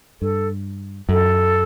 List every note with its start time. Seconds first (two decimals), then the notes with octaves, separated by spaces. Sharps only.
0.21 G2 A4
1.09 F#2 A4